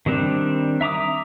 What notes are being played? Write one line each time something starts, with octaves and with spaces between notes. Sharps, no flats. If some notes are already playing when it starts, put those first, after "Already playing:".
D#3 G3 C4 D4
E5 A#5 D6 D#6